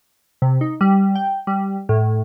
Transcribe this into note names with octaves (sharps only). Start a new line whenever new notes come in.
C3
D#4
G3
G5
G3
A2